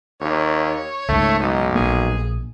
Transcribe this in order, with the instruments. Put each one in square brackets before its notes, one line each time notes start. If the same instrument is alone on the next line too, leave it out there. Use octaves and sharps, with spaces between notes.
[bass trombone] D#2 [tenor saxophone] C#5
[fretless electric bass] C#2 G#2 [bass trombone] A3
[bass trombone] B1 [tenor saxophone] D#4
[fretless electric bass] A#1 A#3 [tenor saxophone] G#4